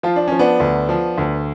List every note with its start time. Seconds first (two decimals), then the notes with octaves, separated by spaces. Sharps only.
0.03 F3 F4
0.16 D4
0.28 F3 C#4
0.39 B3 D4
0.60 D2
0.89 F3
1.18 D2